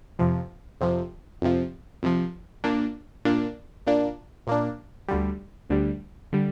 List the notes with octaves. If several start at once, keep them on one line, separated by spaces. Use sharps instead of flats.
F2 C3 F3
F2 C3 F3
F2 C3 F3
F2 C3 F3
A#2 A#3 D4
A#2 A#3 D4
A#2 A#3 D4
A#2 A#3 D4
D2 D3 G3
D2 D3 G3
D3 G3